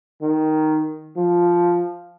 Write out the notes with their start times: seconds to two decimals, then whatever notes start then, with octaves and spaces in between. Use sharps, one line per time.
0.21 D#3
1.16 F3